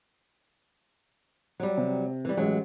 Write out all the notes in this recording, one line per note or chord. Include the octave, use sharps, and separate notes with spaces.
F#3 G3
C3
E3 G3
A1 F#3 G#3